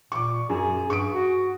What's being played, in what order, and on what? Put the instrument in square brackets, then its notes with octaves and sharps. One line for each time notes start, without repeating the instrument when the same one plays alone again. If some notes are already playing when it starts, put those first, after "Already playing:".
[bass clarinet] A#2 [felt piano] C#6 D6
[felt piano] F#2 [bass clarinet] G#4
[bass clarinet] G2 [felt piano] C#6 D#6 D7
[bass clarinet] F#4